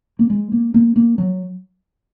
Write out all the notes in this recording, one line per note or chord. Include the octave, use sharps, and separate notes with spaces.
A#3
G#3
A#3
A#3
A#3
F#3